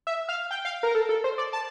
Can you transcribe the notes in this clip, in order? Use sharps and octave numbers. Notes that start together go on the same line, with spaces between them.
E5
F5
G5
F5
A#4
A4
A4
C5
D5
A5